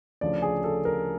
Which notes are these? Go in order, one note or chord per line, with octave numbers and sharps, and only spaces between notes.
D2 C#3 F3 D5
G#4
A4
A#4